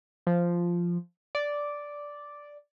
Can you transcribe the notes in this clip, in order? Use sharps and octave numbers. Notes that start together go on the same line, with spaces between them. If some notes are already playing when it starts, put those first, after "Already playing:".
F3
D5